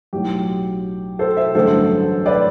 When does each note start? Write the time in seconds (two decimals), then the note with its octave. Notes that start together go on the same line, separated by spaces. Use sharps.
0.13 B1 A2 F#3 G4
1.19 A4 C5
1.37 C5 E5
1.55 A1 G2 D3 F#3 A4 C5
2.26 B4 D5